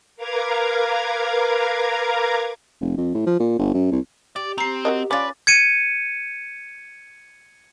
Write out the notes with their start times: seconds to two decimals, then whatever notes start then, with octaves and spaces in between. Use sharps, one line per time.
0.16 A#4 B4 F5 A#5 D6 G#6
2.81 F1
2.98 F2
3.14 A2
3.26 F3
3.40 A#2
3.59 G1
3.74 F#2
3.92 C2
4.36 G4 D5
4.58 C4 G4 A#5 C7
4.85 F#3 A#4 D#5
5.11 C#4 D4 F4 B4 D5 D6 A6
5.47 G#6 C#7 D#7